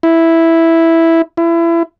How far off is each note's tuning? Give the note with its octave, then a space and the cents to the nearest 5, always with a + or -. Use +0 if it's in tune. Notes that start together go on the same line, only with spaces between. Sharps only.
E4 +0
E4 +30